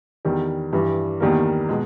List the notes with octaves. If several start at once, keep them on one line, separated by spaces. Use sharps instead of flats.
E2 D#3 G3
G2 E3 G3
E2 D#3 G3 A#3
B2 G#3